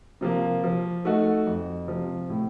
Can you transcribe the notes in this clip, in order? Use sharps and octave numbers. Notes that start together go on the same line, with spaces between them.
C3 F3 A#3
F3
A3 D#4 F#4 A4
F2
C3 F3
A2